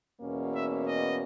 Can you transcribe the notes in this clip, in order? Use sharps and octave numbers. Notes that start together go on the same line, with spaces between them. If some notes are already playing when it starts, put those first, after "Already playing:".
E2 B2 A#3 C#4
E5
D#5